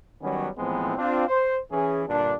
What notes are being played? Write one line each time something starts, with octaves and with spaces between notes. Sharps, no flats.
D#3 F#3 G3 B3 C#4
A2 E3 F3 G#3 B3 C4
C4 D4 F4
C5
E3 C#4 G#4
G2 A#2 D3 D4